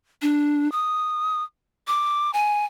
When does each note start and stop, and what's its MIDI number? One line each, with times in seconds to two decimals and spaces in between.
0.22 0.70 62
0.72 1.43 87
1.87 2.31 86
2.34 2.65 80